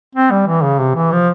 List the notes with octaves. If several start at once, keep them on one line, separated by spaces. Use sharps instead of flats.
C4
G3
E3
C#3
C3
E3
F3